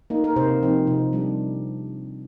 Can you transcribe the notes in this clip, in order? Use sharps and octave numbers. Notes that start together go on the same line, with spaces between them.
A#3 D#4
A#4
C3 C5
F3 C4 D#4
C3
G3 D4